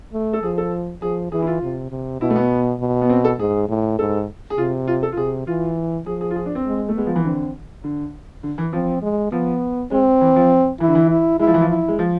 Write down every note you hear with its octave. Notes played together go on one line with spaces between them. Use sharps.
A3
A4
F3 G#4
A4
F3 G#4
E3 G#4
E4
F4
C3
C3
B2 E4
A3
B3
B2
B3
C4
A4
G#2 G#4
A2
G#2 A4
G#4
C3 F4
F4
A4
F4
C3 G#4
E3 F4
F3 G#4
G#4
F4
G#4
D4
C4
G#3
A3
G#3 B3
F3
E3
D3 C4
D3
D3
E3
F3 C4
G#3
F3 B3
G#3 C4
E3
F3
E3 E4
D3
E3
E4
G#3 E4
F3
E3
F3
E4
G#3
F3